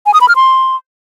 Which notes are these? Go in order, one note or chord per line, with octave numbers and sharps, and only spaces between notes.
G#5
D#6
B5
F6
C6